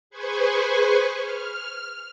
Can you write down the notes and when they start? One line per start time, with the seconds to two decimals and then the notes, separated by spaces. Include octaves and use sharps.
0.10 G#4 B4 C5 G#5 C#6
1.20 F6